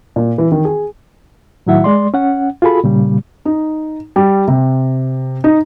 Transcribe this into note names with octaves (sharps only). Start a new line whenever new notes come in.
A#2
E3
D#3
G#4
A2 D#3 F#3 E4 E5 F#5
G#3 D5 C6
C#4 F#5
F4 F#4 G#4 A4 B5
A#2 C#3 G3
D#4
G3
C3
D#4